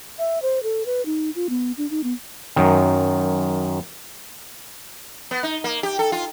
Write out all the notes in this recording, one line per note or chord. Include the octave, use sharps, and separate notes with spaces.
E5
C5
A4
B4
D#4
F4
B3
D4
D#4
B3
F#2 D#3
B3
D#4
A#3
G4
A4
F4